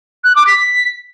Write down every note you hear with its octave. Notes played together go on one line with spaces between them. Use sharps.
F#6
D6
B6